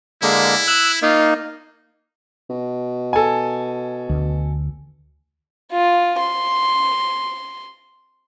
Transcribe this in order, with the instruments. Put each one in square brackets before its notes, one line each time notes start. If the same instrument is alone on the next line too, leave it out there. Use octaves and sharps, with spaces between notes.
[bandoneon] D3 G#3 A#3 [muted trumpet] E4
[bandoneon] E6 F#6
[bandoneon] A#3 D#4 [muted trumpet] F4
[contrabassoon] B2
[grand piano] A4 G#5
[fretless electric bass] D2
[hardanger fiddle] F4
C6